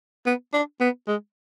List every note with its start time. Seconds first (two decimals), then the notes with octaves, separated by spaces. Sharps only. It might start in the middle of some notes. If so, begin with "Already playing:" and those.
0.26 B3
0.53 D4
0.80 B3
1.08 G#3